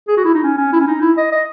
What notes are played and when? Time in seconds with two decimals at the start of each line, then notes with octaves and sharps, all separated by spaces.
0.08 G#4
0.17 F#4
0.25 E4
0.35 D#4
0.43 C#4
0.58 C#4
0.73 E4
0.80 C#4
0.87 D#4
1.02 E4
1.17 D#5
1.32 D#5